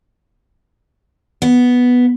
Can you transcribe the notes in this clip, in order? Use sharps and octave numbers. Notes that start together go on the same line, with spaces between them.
B3